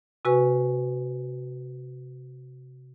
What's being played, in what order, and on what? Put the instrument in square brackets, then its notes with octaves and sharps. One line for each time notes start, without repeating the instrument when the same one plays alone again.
[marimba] C3 F#4 B4 G#5 C#6